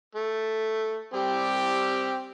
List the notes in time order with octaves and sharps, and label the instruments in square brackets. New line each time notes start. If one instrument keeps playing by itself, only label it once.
[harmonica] A3
[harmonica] G3 C4 [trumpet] G4